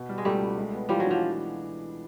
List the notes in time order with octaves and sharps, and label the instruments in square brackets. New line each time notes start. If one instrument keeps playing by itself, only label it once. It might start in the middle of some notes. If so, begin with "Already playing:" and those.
Already playing: [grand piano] B2
G3
[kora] G#3
[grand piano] C#2 [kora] G3 A3
[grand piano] C#2
G#3
B3
[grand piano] E3 [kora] F3 G3
[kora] F#3
[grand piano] D4
[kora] F3